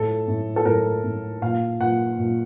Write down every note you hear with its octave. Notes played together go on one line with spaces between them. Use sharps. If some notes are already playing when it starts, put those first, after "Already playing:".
Already playing: A2 A4
A2
A4
A2 A#4
A2
A#2 F5
A#2 F#5
A#2